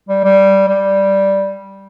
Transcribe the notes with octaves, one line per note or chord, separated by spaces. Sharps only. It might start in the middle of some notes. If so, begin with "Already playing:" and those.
G3
G3
G3